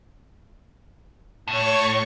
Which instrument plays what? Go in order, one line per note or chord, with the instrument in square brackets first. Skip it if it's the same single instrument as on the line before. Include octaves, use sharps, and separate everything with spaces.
[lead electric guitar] A2 [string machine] C#5 C#6